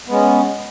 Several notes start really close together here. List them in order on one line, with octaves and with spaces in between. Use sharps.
B3 G#3 C#4